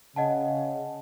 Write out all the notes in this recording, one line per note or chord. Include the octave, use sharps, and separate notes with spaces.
C#3 D#5 F#5 A5